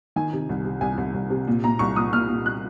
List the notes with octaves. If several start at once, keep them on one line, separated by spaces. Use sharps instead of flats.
D#3 G#5
C3
C2
C3
C2 G#5
C2
C2
C3
A#2
A#2 A#5
C2 C#6
A#2 D#6
A#2 F6
A#2
F#6